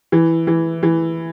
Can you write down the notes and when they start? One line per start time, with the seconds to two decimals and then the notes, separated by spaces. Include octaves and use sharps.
0.12 E3
0.47 E3
0.83 E3